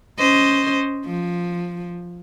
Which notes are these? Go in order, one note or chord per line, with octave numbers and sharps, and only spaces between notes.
C#4 C5 D#5
F3